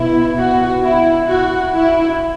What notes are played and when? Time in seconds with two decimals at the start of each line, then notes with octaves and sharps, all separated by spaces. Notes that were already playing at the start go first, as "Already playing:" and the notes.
Already playing: B2 B3 E4
0.38 F#4
0.84 E4
1.28 F#4
1.72 E4